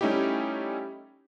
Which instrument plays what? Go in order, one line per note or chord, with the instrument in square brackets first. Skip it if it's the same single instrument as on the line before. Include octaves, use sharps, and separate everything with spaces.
[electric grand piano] G3 A3 C#4 D#4 E4 G4